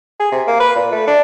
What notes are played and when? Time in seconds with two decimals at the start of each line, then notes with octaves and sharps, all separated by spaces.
0.20 G#4
0.32 C3
0.47 A#3
0.60 B4
0.76 A#2
0.92 A3
1.07 D4